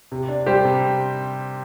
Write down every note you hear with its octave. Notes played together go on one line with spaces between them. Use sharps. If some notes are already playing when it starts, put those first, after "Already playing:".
C3
D4
G3 G4 C5
C3